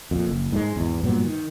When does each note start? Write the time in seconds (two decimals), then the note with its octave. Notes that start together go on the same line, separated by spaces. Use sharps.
0.11 F2 A#2
0.27 F#1
0.52 G#2 F#3 G#3
0.76 G#1 E2
1.03 G2 A#2 F#3 B3
1.25 D#3